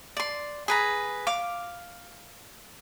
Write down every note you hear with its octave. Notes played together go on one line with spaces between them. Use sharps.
D5 C6
G#4 B4 A#5
F5 D6